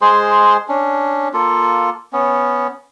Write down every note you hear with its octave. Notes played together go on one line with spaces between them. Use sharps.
G#3 G#4 C5 C6
C#4 D4
A#3 F4 A4
B3 C#4